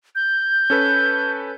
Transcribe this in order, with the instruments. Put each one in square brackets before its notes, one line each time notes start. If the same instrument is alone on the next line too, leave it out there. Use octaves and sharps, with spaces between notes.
[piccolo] G6
[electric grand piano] C#4 A4 B4